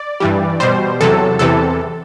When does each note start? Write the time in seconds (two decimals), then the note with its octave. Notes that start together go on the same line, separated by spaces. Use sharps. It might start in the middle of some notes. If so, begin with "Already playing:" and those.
Already playing: D5
0.20 G2 E3 G3
0.60 B2 G3 C5
1.01 E2 C3 F#3 A4
1.39 E2 C3 E3 A4